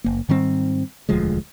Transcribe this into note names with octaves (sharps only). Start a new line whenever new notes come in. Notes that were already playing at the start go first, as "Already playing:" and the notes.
F#1 A#3
G#2 D#3 G3 C4
E1 D2 F3 G#3